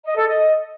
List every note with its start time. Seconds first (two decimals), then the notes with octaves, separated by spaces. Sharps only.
0.05 D#5
0.16 A4
0.27 D#5